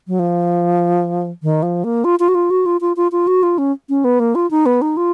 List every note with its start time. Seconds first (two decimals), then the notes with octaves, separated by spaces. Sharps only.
0.08 F#3
0.19 F3
1.43 D#3
1.63 F3
1.84 A#3
2.04 F4
2.20 F4
2.28 F#4
2.35 F4
2.50 F#4
2.66 F4
2.81 F4
2.97 F4
3.12 F4
3.27 F#4
3.43 F4
3.58 C#4
3.89 C#4
4.04 B3
4.20 A#3
4.35 F4
4.51 D#4
4.66 B3
4.82 D#4
4.97 F4